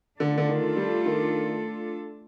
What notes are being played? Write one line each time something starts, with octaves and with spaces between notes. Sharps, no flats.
D3 A3 D4 F4 A4
D3
D#3
G3
D#3